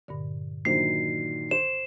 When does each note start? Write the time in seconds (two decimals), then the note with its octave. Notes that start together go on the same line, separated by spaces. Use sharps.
0.08 G2 A#2 D3
0.65 A#2 D#3 F#3 D4 C5 C7
1.51 C5 E7